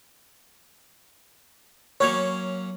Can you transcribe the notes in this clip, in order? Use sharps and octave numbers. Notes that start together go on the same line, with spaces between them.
F#3 A#3 C#4 C#5